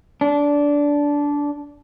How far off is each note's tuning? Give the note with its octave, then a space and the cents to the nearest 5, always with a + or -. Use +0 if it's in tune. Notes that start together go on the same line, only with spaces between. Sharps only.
D4 -15